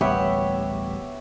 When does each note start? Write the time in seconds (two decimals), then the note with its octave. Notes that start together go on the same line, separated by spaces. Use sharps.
0.01 A1 D2 G3 B3 G4 C#5 E5 F#5